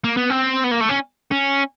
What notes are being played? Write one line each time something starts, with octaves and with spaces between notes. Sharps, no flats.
A#3
B3
C4
B3
A#3
A3
C#4
C#4